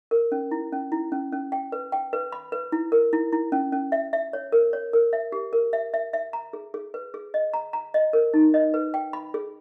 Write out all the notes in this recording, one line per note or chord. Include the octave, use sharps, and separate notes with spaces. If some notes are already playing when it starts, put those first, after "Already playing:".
A#4
C#4
E4
C#4
E4
C#4
C#4
G5
B4
G5
B4
B5
B4
E4
A#4
E4
E4
C#4
C#4
E5
E5
C#5
A#4
C#5
A#4
E5
G4
A#4
E5
E5
E5
A#5
G#4
G#4
B4
G#4
D#5
A#5
A#5
D#5
A#4
D#4
D#5
B4
G5
B5
G#4